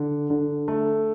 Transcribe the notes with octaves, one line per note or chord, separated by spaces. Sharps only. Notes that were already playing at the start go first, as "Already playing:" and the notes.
Already playing: D3
D3
A3